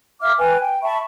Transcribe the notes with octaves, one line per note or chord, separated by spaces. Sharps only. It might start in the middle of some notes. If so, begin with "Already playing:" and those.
E5 F5 D6 F6
B4 G5 G#5
G5
E5 A5 B5 C#6